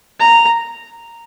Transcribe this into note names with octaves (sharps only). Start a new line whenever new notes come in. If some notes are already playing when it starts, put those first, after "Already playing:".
A#5